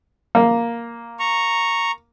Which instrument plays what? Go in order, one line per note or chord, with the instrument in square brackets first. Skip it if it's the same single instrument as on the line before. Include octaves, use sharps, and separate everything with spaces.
[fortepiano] A#3
[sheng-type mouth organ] A#5 C#6